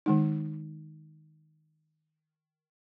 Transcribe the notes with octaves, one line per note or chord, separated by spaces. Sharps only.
D#3 G#3 D#4